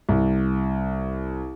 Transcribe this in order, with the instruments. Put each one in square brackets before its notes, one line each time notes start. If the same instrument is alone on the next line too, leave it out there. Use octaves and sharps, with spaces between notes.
[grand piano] C2